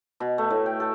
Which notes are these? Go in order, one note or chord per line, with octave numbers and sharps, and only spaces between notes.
B2
A3
A2
G5
A4